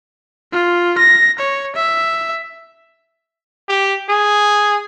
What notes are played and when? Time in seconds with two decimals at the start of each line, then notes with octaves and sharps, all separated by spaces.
0.53 F4
0.99 A#6
1.39 C#5
1.76 E5
3.69 G4
4.09 G#4